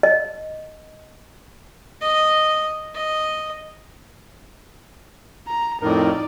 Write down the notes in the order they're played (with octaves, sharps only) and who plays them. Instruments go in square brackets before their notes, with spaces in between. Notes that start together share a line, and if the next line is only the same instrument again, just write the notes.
[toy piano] D#5
[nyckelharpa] D#5
D#5
[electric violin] A#5
[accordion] F2 A2 [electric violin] D#4 D5 [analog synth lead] A#4